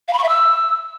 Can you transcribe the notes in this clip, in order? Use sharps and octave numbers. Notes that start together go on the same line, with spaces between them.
F5
B5
C#6
E5
E6